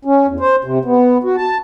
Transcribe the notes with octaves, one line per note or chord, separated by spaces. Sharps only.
C#4
E2
C5
C3
B3
F#4
A5